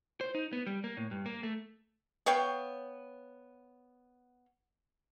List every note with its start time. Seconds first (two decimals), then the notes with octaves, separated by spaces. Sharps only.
0.21 C5
0.35 D#4
0.53 B3
0.67 G3
0.84 A#3
0.97 A2
1.11 G2
1.26 A#3
1.43 A3
2.26 B3 C#5 F5 G5